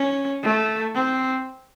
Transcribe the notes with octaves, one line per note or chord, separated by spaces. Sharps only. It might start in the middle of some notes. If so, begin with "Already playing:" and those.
Already playing: C#4
A3
C4